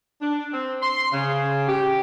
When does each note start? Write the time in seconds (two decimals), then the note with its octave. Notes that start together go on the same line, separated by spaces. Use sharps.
0.21 D4
0.53 C4
0.82 C6
1.12 C#3
1.68 G4